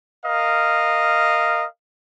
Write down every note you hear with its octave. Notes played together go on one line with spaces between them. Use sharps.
A#4 D#5 F5